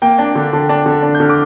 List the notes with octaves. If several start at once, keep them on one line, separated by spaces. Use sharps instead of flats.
A#3 G5
D4
D3
D3
D4
D3
D4
G6
D3 F6
D6